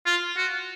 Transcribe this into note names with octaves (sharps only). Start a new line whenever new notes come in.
F4
F#4